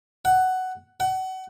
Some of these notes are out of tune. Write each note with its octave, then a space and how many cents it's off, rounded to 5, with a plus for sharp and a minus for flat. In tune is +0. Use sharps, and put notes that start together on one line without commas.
F#5 +10
F#5 +30